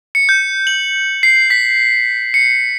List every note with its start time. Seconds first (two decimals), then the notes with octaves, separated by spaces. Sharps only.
0.15 C#7
0.29 G6
0.67 F#7
1.23 C7
1.50 B6
2.34 C#7